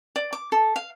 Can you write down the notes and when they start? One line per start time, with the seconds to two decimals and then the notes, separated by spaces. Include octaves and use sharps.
0.16 D5
0.33 D6
0.52 A4
0.76 F5